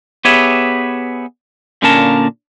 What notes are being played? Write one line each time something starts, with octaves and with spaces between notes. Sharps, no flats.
B3 G4 G#4 B4 C#5 E5
A#2 D3 A#3 C#4 A#4 A5